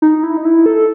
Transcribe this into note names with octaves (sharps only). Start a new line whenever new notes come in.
D#4
E4
D#4
E4
A4